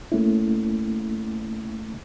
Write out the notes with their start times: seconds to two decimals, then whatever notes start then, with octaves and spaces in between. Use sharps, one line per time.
0.12 A3 A#3 C#4 E4